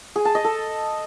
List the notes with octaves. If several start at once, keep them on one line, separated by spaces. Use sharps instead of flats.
G#4
A5
D#5
A4